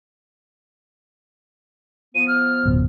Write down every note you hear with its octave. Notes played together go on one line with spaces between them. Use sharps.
F3 B3 D#7
F6
D1 F#2 B2